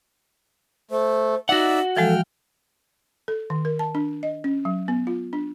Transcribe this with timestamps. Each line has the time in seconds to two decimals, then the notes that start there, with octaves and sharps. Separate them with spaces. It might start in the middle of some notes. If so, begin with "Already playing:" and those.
0.91 A3 C5
1.49 D#4 F#4 D5 E5 F#5
1.96 E3 F3 G#3 A4 G5 F6
3.28 A4
3.50 D#3
3.65 A#4
3.79 A5
3.95 D4
4.23 D#5
4.44 C#4
4.65 F#3
4.88 B3
5.07 F4
5.33 D4